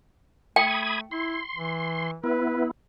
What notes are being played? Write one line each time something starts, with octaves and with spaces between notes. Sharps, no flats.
A3 G5 B5 D#6 G#6
E4 C6
E3
B3 E4 B4